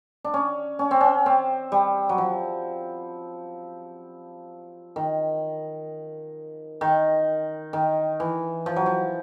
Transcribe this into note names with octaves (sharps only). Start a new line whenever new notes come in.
D4
C#4
C#4
C4
C#4
C4
G3
F#3
F3
D#3
D#3
D#3
E3
F3
F#3
F3